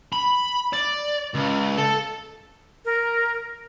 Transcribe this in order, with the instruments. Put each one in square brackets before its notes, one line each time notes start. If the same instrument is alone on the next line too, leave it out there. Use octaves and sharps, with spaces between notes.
[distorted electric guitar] B5
D5
C#2
A4
[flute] A#4